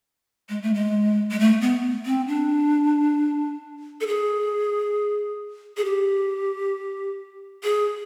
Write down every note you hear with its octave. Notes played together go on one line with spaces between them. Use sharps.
G#3
A3
G#3
G#3
A3
B3
C4
D4
A4
G#4
G#4
G4
G#4